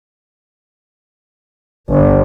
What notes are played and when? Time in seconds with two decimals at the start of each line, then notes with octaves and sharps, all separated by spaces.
1.89 G1